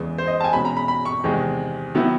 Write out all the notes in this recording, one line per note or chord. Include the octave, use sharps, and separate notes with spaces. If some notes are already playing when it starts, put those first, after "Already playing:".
Already playing: E2 C#3 E3 G#3
C5
D#5
A5
G#5
E2 B2 G#3 C#4 B5
A#5
B5
B5
C#6
E2 C3 D#3 G#3
D#3 F#3 B3 E4